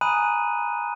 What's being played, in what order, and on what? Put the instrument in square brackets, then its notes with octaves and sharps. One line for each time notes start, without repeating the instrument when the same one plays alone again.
[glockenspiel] G#5 A#5 B5 D#6 F#6 D#7